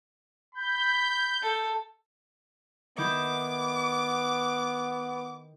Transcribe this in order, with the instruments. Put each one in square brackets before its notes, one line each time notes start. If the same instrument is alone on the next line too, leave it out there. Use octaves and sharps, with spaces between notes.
[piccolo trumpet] B5 [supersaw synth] G6
[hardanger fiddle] A4
[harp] D#3 E4 G6 [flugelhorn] B3 [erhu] D6